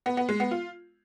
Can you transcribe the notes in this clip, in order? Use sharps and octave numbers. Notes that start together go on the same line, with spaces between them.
B3
B3
G#3
B3
F4